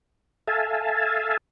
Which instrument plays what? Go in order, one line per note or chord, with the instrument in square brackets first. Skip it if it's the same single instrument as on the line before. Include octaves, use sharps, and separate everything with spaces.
[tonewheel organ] A4 E5 F5 G#5 A5